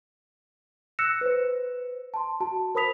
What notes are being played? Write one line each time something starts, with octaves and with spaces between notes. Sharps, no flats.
E6 F#6 A#6 C#7 E7
B4 C5
A5 C6
F#4 A5
A#4 C5 B5 D#6 B6 F7